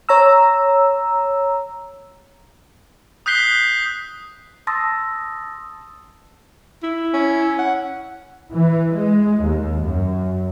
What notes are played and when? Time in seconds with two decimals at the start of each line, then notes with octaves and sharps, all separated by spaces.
0.09 C#5 A#5 E6
3.26 D#6 F#6 G6 B6 C7 G7
4.67 A5 C6 D#6 E6 A6 A#6
6.83 E4
7.14 C#4
7.59 F#5
8.51 E3
8.93 G#3
9.42 D#2
9.82 F#2